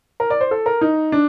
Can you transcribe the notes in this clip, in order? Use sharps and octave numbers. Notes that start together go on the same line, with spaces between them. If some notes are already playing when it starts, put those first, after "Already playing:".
A#4
D5
C5
A4
A#4
D#4
D4